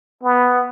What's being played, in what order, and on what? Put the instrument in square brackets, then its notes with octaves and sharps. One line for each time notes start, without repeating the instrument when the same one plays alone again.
[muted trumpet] B3